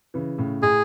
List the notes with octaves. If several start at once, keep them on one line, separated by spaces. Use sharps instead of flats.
C#3 E3
A2 C#3
A2 G#4